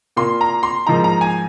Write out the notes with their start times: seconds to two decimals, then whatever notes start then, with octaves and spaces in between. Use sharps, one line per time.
0.16 A#2 A#3 F4 C6
0.41 A#5
0.63 C6
0.87 G#2 F3 A#3 D#4 A#5
1.04 A#5
1.21 G#5